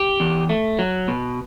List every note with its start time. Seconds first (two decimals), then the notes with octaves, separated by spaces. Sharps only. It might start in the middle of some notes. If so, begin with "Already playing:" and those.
Already playing: G4
0.20 E2
0.49 A3
0.79 F#3
1.08 B2